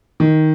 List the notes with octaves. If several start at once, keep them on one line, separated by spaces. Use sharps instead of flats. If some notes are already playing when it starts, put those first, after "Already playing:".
D#3